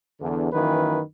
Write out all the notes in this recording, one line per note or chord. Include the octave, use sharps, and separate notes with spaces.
E2 D3
F#2 D#3 E3 A#3 B4